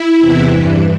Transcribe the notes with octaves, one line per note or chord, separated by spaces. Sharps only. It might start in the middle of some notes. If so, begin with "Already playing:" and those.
Already playing: E4
E2 C3 E3
G2 E3